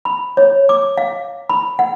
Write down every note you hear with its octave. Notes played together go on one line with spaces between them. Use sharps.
B5
C#5
D6
F5
B5
F#5